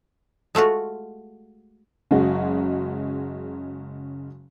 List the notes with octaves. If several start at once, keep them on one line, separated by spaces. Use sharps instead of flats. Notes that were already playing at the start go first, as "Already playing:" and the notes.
G#3 A3 F4 F#4
F#1 C#3 F#3 G#3 F#4